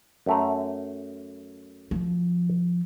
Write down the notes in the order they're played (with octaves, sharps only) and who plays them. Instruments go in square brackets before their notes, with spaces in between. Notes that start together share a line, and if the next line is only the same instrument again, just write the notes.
[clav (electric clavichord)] F#2 A3 A#5
[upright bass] F3